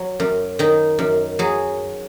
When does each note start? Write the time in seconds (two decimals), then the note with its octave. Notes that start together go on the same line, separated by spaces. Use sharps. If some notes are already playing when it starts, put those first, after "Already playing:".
Already playing: F#3
0.20 F#2
0.59 D#3 D#4
0.99 F#2
1.39 F#3 G#4